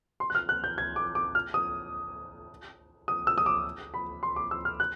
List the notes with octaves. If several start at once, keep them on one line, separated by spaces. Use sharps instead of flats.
C6
F#6
F6
F#6
G6
G#6
D6
D6
F6
D#6
D#6
E6
D#6
D6
B5
C6
D6
E6
F6
F#6